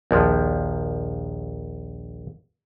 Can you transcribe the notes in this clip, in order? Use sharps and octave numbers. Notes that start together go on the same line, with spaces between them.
A#1 D#2 F3